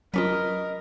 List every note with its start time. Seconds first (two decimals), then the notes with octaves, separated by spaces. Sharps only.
0.14 F#3 C#4 F4 A#4 B4 D5 D#5